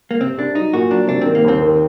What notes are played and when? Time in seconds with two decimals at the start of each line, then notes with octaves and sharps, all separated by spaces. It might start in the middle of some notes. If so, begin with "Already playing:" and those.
0.11 A#3
0.21 C3 C4
0.38 C2 D4
0.55 F#3 D#4
0.73 A#2 F#4
0.91 F#3 D4
1.09 C3 D4
1.21 D#3 C4
1.35 A#3
1.44 D#2 C4
1.61 D#3